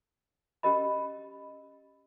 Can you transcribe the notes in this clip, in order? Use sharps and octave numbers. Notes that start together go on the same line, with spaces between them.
C#4 G4 A#4 D#5 B5